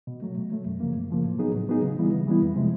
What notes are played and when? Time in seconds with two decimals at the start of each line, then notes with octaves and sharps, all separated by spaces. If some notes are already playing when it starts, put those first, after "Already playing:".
0.07 B2
0.22 F#3 A3
0.37 B2
0.52 F#3 A3
0.66 F#2
0.80 C#3 F3 A#3
0.96 F#2
1.10 C#3 F3 A#3
1.25 A2
1.39 F#3 B3 D#4 G#4
1.54 A2
1.68 F#3 B3 D#4 G#4
1.83 C#3
1.98 E3 G3 B3 E4
2.12 C#3
2.27 E3 G3 B3 E4
2.42 F2
2.56 C3 F3 G#3